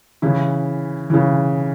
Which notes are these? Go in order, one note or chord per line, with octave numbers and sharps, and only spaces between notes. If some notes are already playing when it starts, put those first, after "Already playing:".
C#3 E3 E4
C#3 E3